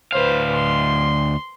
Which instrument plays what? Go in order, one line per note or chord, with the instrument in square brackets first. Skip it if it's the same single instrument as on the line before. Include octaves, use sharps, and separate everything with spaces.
[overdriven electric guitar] D2 F5 [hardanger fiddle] B4 C5
[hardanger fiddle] C6